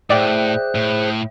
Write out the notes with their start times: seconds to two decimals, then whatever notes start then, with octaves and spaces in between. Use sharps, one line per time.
0.10 A2 G#4 C5 D5 E5 G5 E6 F#6
0.75 A2